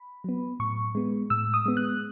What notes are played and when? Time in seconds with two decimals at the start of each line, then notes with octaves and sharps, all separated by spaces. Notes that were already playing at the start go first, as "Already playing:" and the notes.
Already playing: B5
0.24 F#3 B3
0.60 A2 C#6
0.95 G#3 B3
1.30 A2 E6
1.54 D#6
1.66 G#3 B3
1.77 F#6